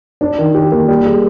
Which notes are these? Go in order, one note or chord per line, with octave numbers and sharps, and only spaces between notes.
D4
D#3
G4
A#3
G3
G#4